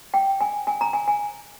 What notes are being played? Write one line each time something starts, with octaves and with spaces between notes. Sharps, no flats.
G5
G#5
G#5
A#5
G#5
G#5